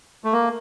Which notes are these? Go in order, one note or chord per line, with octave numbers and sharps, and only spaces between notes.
A3
A#3